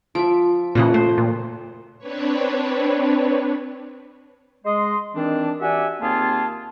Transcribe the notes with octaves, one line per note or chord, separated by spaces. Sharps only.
F3 E5 D7
A#2 C#3 E3 F3 F#4 D#5
A3 C5
A#2
C4 D4 B4 C#5
G#3 D#5 C6
D#3 E3 C4 D4
F#4 G4 D5 E5 F#5 G#5
D#2 A#3 C4 F4 G#4 A5